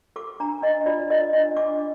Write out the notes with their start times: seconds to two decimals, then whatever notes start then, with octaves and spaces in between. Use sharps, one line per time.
0.16 A4 D6
0.40 D4 A#5
0.63 D4 D#5
0.86 F4 D5
1.10 A4 D#5
1.33 D4 D#5
1.57 D4 D6